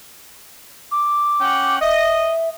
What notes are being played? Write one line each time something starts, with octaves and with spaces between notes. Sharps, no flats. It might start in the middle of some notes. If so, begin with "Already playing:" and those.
D6
C#4 F#5 G5
D#5 E5